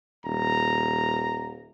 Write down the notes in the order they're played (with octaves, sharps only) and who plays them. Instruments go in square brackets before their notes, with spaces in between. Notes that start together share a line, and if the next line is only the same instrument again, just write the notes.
[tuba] D#1 [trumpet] A#5